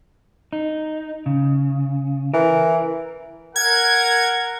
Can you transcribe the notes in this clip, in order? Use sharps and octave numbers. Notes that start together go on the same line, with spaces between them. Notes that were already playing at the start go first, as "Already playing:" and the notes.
D#4
C#3
E3 A#4
A#4 F#5 G#6